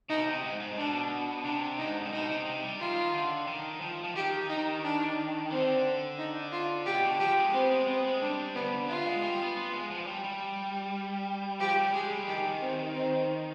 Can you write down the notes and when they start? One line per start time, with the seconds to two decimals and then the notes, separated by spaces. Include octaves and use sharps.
0.09 B2 D#4
0.26 C3
0.43 G#2
0.60 G#2
0.77 B2 D4
1.44 C3 D4
1.78 G#2 D#4
2.05 C3
2.12 B2 D#4
2.29 C3
2.46 C3
2.63 G3
2.80 D#3 F4
3.14 D3
3.47 D#3
3.81 F3
4.04 F3
4.15 D#3 G4
4.49 D#4
4.83 D4
5.51 D3 C4
6.18 D#4
6.52 F4
6.86 B2 G4
7.03 D3
7.20 F3 G4
7.37 G#3
7.53 B3 C4
7.71 G#3
7.87 B3 C4
8.05 G#3
8.21 G3 D4
8.55 D3 B3
8.89 B3 F4
9.06 G#3
9.23 G3
9.40 B3
9.56 B3
9.73 G#3
9.90 F3
10.07 G3
10.24 G3
11.60 F3 G4
11.77 G3
11.93 G#3 G#4
12.11 G3
12.27 D#3 G4
12.61 C4
12.95 C4